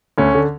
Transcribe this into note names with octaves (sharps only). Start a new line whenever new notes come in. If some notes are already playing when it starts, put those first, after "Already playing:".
D2 C#4
D3